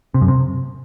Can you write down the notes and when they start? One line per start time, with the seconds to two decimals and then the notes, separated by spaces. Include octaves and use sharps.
0.14 C3
0.21 F#2
0.28 C3